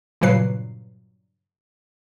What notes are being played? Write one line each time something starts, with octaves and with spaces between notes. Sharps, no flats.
G2 A#2 C#3 F#3 B4 C7